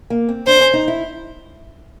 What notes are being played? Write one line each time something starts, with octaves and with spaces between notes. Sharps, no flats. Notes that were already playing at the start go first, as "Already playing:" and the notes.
A#3
C4
D4 C5
C#4
D#4
E4